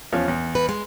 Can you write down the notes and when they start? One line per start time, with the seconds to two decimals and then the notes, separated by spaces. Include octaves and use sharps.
0.13 E2 F3 C#4
0.28 E2
0.55 B4
0.69 G#3